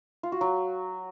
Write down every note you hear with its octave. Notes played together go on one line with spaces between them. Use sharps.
F4
F#4
F#3